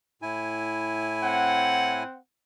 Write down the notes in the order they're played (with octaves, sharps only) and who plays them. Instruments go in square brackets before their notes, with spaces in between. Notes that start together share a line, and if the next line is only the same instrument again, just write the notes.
[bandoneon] A2 E4 G#5
[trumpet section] C4 F#5